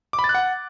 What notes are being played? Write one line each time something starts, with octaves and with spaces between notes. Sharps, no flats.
D6
B5
A6
F#6
F#5